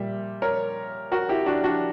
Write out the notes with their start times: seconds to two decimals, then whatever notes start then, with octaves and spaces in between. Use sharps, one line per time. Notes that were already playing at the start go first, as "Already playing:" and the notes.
Already playing: A#2 G3 E5
0.42 A#4 C#5
1.12 F#4 A#4
1.29 E4 G4
1.46 D4 F#4
1.64 D4 F#4